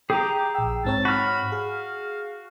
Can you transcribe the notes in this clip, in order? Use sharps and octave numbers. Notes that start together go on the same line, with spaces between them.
G4 G#4 G5 A#5
G4
A#1 G5 E6
G#2 C4 C#5 A5
F#4 B5 F6
G#4 F5